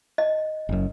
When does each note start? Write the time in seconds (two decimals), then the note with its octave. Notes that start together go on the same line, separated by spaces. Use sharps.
0.18 D#5
0.69 F#1 F#2